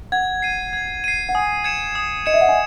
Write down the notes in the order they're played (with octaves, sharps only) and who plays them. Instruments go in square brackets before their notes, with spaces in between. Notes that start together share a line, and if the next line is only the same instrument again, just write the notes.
[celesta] F#5 [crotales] G#6
[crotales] C7 D#7
G#6
C7 D#7
[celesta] F#5
[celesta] G#5 [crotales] D#6
[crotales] G#6 C#7 E7
D#6
[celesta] D#5 [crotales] G#6 C#7 E7
[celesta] E5
F#5
G#5